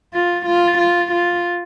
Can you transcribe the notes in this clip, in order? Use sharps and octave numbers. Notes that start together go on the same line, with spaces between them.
F4
F4
F4
F4